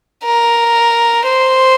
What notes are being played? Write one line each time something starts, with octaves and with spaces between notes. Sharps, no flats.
A#4
C5